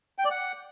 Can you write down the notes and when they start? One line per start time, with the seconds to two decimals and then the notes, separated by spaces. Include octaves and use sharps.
0.18 G5
0.25 D5
0.31 F#5